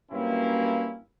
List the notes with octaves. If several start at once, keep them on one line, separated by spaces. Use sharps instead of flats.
G2 F#3 A#3 C4 C#4 E4